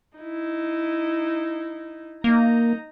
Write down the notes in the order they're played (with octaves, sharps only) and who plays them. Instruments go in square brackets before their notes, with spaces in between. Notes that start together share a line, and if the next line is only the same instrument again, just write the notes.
[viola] D#4 E4
[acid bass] A#3 [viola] D#4 A#5